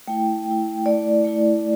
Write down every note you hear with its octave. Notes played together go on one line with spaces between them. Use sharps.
A3 E4 G5
A3 E4
A3 E4 D5
A3 E4